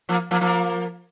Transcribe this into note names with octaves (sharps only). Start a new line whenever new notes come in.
F3 A#3
F3 A#3
F3 A#3